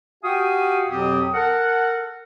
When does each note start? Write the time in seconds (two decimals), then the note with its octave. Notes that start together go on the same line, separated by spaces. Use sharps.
0.23 F#4 G4 F5 G5 G#5 D#6
0.89 F2 B2 F#3 C4 G4 D#6
1.33 A4 A#4 F#5